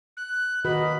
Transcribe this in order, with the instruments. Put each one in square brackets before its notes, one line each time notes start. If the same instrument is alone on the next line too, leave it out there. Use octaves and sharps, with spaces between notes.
[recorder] F#6
[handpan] D#3 F#4 B4 [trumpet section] A#3 D#5 [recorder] B5